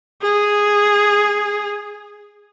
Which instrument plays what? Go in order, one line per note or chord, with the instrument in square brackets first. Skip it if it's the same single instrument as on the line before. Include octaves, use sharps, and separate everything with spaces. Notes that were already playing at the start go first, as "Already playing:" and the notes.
[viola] G#4